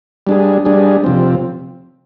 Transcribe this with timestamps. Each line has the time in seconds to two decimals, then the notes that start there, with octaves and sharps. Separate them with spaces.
0.27 G3 D4 G#4
0.65 G3 D4 G#4
1.04 C3 F3 C4